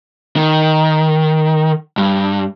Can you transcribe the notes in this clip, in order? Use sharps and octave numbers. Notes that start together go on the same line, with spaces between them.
D#3
G2